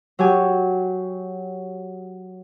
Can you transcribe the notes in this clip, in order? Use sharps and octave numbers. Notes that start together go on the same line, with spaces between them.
F#3 G4 G#5